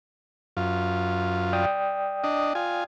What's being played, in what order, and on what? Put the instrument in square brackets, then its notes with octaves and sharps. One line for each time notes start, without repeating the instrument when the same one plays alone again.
[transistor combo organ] F#2 F4
[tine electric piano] D5 G5 D#6
[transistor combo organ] D4 D#5
F4 G#5